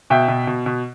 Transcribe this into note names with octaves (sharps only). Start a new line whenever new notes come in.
B2 E5 G5
B2
B2
B2